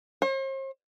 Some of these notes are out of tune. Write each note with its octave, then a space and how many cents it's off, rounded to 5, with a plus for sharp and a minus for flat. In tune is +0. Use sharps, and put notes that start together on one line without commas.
C5 +45